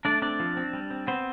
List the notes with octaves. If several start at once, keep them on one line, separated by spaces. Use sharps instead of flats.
A3 D4 D5
C4 D4 D5
F3
C4
G3
C4
B3 C4 C5